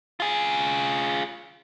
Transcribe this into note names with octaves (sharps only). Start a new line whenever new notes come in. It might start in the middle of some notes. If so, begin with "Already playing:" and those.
F4 G#4